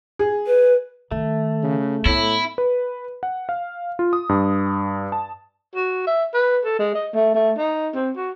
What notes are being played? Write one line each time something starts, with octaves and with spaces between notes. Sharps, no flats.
G#4
B4
D#3 A3
C#3
A2 B3 E4
B4
F#5
F5
F4
D#6
G2
A5
F#4
E5
B4
A4
G#3
D#5
A3
A3
D#4
C4
F#4